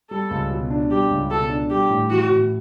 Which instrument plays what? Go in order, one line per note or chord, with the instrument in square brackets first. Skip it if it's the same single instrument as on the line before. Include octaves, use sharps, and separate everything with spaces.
[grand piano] G3 [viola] A4
[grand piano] C#2
B2
D4
[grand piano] G3 [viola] G4
[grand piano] C#2
[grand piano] B2 [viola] A4
[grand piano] D4
[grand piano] G3 [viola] G4
[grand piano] A2
[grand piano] E3 [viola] F#4
[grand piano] A2